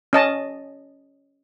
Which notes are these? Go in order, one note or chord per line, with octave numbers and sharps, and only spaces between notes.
C#4 D#5 A5